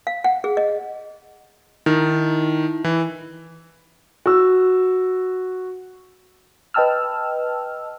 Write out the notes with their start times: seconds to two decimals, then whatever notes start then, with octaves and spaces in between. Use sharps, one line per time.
0.07 F5
0.24 F#5
0.44 G#4
0.57 D#5
1.86 D#3 D#4 E4
2.84 E3
4.26 F#4 E6
6.74 B4 D#5 G5 A5 E6 F6